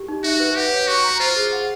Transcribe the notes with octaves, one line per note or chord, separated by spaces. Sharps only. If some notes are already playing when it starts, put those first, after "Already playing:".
Already playing: G4
D#4
F#4 E5
B4
G4 F#5
C#5
F#4 C#6
A#5
F4 C5
G#4
F#5